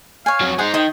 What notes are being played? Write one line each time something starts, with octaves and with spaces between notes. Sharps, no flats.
C#5 F5 G#5
F2 F#3
D#4 G#4 C5 F#5
D#3 D#5 G5